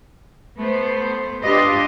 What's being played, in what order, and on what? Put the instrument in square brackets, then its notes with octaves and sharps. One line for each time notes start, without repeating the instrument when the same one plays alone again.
[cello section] A3 B3 C5
D4 F4 G4 B4 D#5